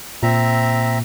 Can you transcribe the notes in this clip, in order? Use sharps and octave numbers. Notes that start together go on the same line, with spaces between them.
A#2 C4 E5 A#5